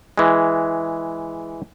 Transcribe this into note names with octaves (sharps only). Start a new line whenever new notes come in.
E3 G#3